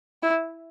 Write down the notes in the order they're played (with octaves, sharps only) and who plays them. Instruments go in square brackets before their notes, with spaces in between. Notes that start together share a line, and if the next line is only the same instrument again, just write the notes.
[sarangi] E4